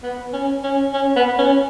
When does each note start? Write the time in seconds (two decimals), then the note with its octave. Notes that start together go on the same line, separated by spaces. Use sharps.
0.03 B3
0.33 C#4
0.64 C#4
0.94 C#4
1.16 B3
1.39 C#4